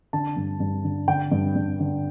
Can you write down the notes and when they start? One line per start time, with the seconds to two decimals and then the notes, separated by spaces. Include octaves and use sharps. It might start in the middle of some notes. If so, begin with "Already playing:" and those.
0.13 D3 A5
0.37 G2
0.60 G2
0.84 D3
1.08 D3 G5
1.32 G2
1.56 G2
1.80 D3